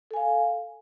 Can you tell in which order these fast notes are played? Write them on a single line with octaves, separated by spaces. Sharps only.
A4 G#5 F5